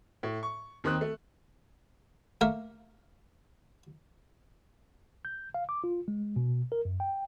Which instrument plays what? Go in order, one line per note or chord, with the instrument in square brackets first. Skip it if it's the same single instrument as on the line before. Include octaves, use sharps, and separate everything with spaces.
[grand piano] A2
C#6
D#2 D#3 C4 D#6 F#6
A3
[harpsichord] A3 A#3 A#4
[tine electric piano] G6
F5
D6
F4
G#3
B2
A#4
F#2
G5